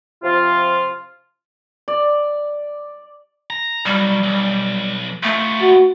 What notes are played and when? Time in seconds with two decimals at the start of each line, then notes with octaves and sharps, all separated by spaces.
0.23 C3 F3 F4
1.88 D5
3.50 A#5
3.86 B1 F#3 G3
4.24 B1
5.23 A3 B3 F4
5.62 F#4